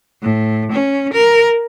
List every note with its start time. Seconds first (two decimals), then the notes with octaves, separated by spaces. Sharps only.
0.22 A2
0.71 C#4
1.13 A#4